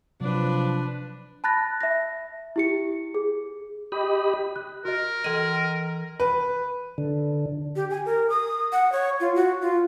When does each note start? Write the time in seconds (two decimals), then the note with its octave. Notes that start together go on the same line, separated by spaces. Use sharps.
0.21 C3 F3 F#3 D4 B4
1.44 A5 B5 F#6 A6 A#6
1.81 E5 A#6
2.56 E4 G4 C#7
3.15 G#4
3.92 G4 D#5 B5
4.56 F#6
4.85 F#4 A#4 D#5
5.24 E3 D#5 D#7
6.20 B4
6.98 D3
7.76 G4
7.90 G#5
8.06 A#4
8.29 D#6
8.72 F#5
8.92 C#5
9.20 F4
9.35 F#4
9.62 F4